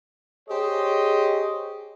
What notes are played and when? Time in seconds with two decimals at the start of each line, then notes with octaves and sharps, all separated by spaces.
0.49 G4 G#4 C5 C#5 D#5